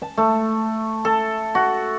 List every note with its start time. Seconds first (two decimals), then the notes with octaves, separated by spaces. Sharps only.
0.02 A5
0.17 A3
1.05 A4
1.55 F#4